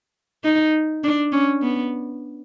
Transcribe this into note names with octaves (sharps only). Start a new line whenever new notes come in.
D#4
D4
C#4
B3